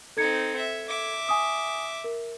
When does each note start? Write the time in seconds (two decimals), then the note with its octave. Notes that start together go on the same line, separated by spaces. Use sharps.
0.17 C4 D#4 A4 G#6 C#7
0.57 E5
0.88 E5 D6
1.29 G#5 D#6
2.04 A#4